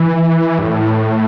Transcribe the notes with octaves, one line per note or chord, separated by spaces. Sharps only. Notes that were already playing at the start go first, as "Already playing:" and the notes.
Already playing: E3
G2
A2